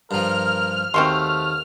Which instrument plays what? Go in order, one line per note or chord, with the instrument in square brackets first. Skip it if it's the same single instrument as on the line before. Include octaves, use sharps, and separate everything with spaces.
[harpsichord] G2 F3 [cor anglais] A#4 [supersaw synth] F6
[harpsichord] D#2 [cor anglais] A3 [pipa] C4 F#4 C6